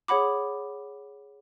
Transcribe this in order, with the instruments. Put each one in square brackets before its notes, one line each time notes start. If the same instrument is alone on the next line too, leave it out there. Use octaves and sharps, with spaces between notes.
[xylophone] G#4 C#5 F#5 B5 D6